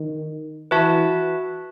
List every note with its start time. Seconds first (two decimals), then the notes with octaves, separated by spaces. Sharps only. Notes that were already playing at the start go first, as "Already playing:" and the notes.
Already playing: D#3
0.71 E3 F#4 B4 E5 A5